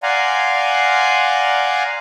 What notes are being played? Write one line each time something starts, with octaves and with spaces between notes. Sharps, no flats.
D5 F5 F#5 G#5 A#5 C6